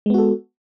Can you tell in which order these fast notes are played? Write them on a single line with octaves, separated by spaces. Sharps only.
G#3 B3 F#4 A4